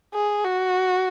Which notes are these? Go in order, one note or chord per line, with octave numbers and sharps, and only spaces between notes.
G#4
F#4